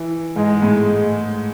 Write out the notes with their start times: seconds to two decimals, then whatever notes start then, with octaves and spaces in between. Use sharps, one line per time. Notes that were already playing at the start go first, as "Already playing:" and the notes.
Already playing: E3
0.36 G#2 G#3
0.62 A2